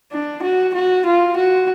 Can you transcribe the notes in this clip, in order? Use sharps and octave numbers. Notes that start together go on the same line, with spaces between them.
D4
F#4
F#4
F4
F#4